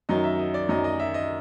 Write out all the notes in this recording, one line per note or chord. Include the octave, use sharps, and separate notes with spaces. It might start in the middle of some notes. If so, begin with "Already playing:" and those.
F#2 D#3 F#3 D#5
E5
D#5
D5
F#2 D#3 F#3 D#5
D#5
E5
D#5